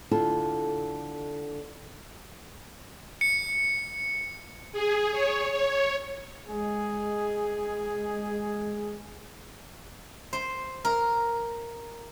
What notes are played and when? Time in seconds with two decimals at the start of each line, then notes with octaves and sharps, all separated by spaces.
0.11 D3 E4 F4 A4
3.21 C#7
4.72 G#4
5.12 C#5
5.51 C#5
6.47 G#3 G#4
10.33 C5
10.85 A#4